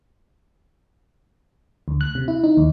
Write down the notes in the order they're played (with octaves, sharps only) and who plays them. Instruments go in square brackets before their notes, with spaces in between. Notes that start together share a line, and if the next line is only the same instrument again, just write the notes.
[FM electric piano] D2
F#6
C3
E4
D#4
D#2